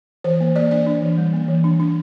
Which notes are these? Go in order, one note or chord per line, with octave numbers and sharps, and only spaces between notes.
E3 C5
A#3
A#3 D5
D4 D5
D4
E3
G3
A#3
E3
D4
D4